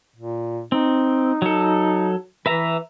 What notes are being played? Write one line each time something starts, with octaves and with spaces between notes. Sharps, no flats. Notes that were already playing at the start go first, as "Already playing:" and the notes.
A#2
C4 D#4
F#3 A4
E3 B4 E5 A#5